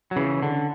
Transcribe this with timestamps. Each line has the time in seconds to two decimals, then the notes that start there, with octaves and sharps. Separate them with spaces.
0.11 F#3
0.16 C#3 E3
0.43 D3